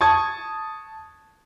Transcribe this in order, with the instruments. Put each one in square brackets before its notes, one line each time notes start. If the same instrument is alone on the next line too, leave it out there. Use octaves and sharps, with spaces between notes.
[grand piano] A5 C#6 D#6 G#6